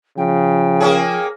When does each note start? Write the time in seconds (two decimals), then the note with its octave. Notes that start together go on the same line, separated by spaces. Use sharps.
0.18 C#3 F3 G5
0.80 A#3 C#4 G#4